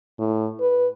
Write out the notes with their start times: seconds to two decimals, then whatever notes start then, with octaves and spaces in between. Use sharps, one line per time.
0.19 A2
0.61 B4